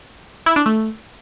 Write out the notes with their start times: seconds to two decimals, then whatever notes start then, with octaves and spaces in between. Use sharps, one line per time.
0.46 E4
0.56 D4
0.66 A3